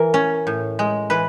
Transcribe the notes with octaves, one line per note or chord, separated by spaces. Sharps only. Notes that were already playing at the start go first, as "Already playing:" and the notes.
Already playing: E3 A#4
C#4
A2
G#3
E3 B4